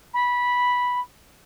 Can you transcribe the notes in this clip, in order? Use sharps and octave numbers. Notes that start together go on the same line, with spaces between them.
B5